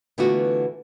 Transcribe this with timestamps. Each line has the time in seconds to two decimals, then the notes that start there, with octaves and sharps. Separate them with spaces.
0.18 D3 E3 A3 B3 F4 F#4